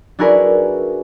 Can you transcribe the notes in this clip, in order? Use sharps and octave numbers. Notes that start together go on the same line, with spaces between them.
D4 E4 F#4 G#4 A#4 B4